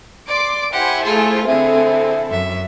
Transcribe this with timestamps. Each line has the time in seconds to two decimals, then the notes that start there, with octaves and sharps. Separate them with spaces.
0.28 D5 C6 D6 D7
0.73 E4 G4 C5 F#5 G#5 C6
1.05 A3 F4 G#4 A4
1.46 D3 C4 E4 G#4 A4 E5
2.30 F#2 E5